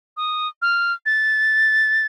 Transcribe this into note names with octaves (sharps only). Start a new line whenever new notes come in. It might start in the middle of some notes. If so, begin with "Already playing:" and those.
D#6
F6
A6